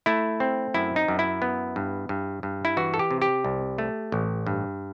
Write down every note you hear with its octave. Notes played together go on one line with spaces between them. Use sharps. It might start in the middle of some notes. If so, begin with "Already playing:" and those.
A3 E4
C4
F#2 E4
D#4
F#2
E4
B3
G2
G2
G2
E4
E3 F#4
A4
G4
C3
G4
C2
A3
A1
G2